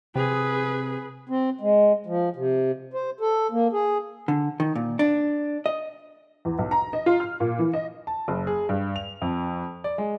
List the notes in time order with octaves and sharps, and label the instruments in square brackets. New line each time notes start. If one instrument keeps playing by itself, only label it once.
[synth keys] C3 [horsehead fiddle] G#4 B4
[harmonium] C4
G#3
F3
C3
C5
A4
A#3
G#4
[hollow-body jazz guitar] D3
D#3
A#2
D4
D#5
[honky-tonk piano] E2
B1
A#5
D#5
F4
F6
A#2
E3
D#5
[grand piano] A5
F#1
G#4
G2
F7
F2
D5
G#3